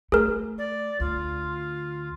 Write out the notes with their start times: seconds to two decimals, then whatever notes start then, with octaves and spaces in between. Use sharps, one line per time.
0.12 A3 G#4 A#4
0.58 D5
1.00 D2 F4